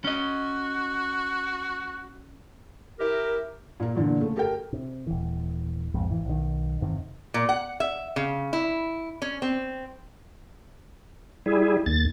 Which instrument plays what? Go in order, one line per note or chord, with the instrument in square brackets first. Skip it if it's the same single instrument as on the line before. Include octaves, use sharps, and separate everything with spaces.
[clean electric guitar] C#4 D#5 [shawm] F#4
[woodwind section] E4 G4 A#4
[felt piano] A#2 A#3
E2 A#2 D3
C#3 A3
G4 A4 A#4 G5
[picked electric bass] C3
D#1 E3
B1 F2 G#2 C3
G#1 E3
B1 D#3
G1 E2 C3 D#3
[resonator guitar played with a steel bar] A#2
F#5
E5
C#3
E4
C#4
C4
[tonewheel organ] G3 E4 G#4
D#2 A6